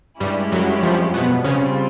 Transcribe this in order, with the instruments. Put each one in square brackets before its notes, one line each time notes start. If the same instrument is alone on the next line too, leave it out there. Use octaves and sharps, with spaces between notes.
[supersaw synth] G2 G3 [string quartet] G#3 C#4 E4 G4
[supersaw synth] F#2 F#3
F2 F3
B2 B3
[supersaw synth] C#3 C#4 [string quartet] G3 C4 F4